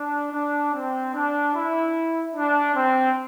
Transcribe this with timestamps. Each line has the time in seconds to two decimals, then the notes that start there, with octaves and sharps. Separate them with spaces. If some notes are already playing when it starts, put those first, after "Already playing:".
Already playing: D4
0.33 D4
0.74 C4
1.14 D4
1.54 E4
2.34 D4
2.75 C4